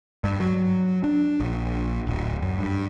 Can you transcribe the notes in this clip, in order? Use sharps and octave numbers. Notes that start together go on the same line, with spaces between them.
G2
F#3
D4
A#1
D1
F#2
G2